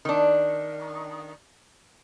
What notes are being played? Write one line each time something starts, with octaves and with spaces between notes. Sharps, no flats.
D#3 D4